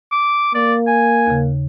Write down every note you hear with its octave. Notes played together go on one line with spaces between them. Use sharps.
D6
A#3 D5
G#5
D#2 C#3